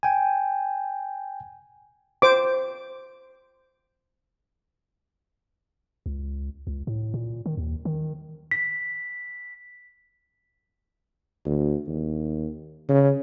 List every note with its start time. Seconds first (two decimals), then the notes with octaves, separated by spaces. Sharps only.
0.03 G5 G#5
2.22 C5 D6
6.06 C#2
6.67 C#2
6.87 A2
7.14 A#2
7.46 D#3
7.57 D#2
7.85 D#3
8.51 B6
11.45 D2
11.87 D#2
12.89 C#3